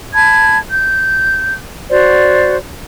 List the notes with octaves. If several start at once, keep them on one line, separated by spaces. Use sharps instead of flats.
A5 B5 G#6
G6
F#4 C5 D5